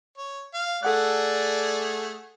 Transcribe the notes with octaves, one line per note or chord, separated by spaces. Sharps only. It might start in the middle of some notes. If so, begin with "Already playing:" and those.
C#5
F5
A3 G#4 A4 D5 F#5 F#6